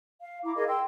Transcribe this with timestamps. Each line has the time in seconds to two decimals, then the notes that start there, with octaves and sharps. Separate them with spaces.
0.21 F5
0.44 E4 A#5 D6
0.56 G#4 A#4 D#5 F5
0.68 G5 C6 E6